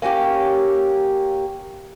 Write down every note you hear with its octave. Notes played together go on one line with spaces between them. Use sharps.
A#3 C#4 F#4 G4